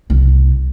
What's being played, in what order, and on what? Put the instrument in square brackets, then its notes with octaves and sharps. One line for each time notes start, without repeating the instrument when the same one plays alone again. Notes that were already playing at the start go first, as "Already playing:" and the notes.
[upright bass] C2